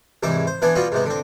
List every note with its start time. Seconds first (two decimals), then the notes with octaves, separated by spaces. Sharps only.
0.23 C2 G#2 E3 E4 D6
0.47 C5
0.62 E3 B3 D4 F#5 G#5
0.76 G3 B3 F4 F#4
0.92 G#2 C3 B3
1.06 D3 C4